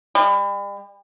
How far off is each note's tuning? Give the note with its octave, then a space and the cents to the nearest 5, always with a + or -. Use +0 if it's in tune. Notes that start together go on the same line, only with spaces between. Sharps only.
G3 +40